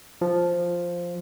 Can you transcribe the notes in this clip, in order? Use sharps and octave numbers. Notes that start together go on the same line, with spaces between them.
F3